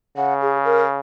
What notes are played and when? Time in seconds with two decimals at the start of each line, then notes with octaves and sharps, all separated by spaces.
0.17 C#3 F#5
0.41 G#4
0.65 A#4